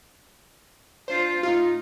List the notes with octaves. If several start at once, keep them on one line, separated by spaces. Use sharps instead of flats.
D4 F4 C5
A2 D#4 F4